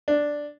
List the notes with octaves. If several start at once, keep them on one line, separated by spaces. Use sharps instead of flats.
D4